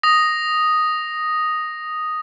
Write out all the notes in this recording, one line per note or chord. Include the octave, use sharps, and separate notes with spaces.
D#6 A#6